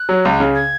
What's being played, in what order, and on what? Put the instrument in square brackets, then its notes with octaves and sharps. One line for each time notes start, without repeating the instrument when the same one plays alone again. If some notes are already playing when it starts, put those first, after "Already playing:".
Already playing: [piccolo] F#6
[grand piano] F#3
C#2
C#3
[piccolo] G#6